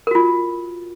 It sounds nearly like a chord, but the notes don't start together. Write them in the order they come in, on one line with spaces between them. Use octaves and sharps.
A#4 F#4 F4